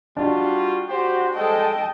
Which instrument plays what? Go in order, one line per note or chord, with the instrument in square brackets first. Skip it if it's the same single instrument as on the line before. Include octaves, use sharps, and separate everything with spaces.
[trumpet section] G3 F4 F#4 [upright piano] D4
[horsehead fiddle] F#4 [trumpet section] G4 C5
[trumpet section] G3 G#3 A4 [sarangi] D#5 [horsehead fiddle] G5 A5